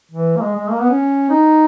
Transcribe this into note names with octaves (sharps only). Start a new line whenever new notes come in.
E3
A#3
G#3
G#3
A#3
B3
C#4
D#4